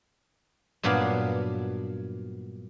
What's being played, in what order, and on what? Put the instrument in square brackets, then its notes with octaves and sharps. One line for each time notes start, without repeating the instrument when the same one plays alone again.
[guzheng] G2 A#2 F#3 B3 D4 F5